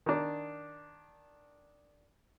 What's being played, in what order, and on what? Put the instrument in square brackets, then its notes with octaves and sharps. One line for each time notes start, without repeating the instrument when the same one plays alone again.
[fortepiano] D#3 D4